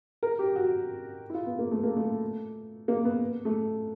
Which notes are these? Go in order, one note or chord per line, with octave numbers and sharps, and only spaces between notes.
A#4
G4
F#4
E4
F4
B3
A#3
A3
A#3
A3
A#3
B3
A3